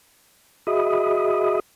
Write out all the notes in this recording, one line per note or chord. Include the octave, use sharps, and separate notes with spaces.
F#4 G#4 D#5 E5 B5 D#6